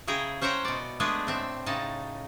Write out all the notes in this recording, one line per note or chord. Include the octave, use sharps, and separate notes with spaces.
C#3 E4 G#4 G5 A#5
C#4 C5 E5 F#5 G5 A#5
B2 D5
G#3 A3 B3 D4 G#4 B4
A2 C4 E5
A2 C#3 D#4 A5